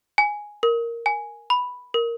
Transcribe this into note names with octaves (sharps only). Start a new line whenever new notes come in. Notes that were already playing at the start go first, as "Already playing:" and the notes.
G#5
A#4
G#5
B5
A#4